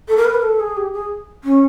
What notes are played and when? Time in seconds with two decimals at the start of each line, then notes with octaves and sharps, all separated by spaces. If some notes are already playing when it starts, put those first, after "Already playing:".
0.08 A4
0.17 A#4
0.25 B4
0.34 A#4
0.42 A4
0.60 G#4
0.77 G4
0.93 G#4
1.44 C#4